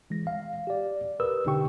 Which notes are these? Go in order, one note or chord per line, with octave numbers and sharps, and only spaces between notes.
E3 G#3 A#6
F5
G4 D5
G4 A#4 B4 D#6 E6
B2 D3 D#4 G4 G5 C#6